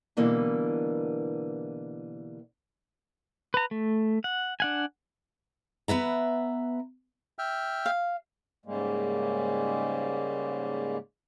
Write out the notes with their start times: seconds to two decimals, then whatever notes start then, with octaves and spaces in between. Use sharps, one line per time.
0.17 B2 D3 E3 G3 A#3 B3
3.54 B4 A#5
3.71 A3
4.24 F#5
4.60 D4 F#5 G#5
5.88 B3 B4 E5 A#5
7.39 E5 G5 F6
7.86 F5
8.66 G#2 C#3 G3 G#3 A#3